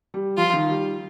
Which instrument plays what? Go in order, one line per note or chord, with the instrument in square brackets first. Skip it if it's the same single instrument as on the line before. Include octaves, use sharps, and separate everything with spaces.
[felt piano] G3
[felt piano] F3 [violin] F4
[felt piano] D#3
G3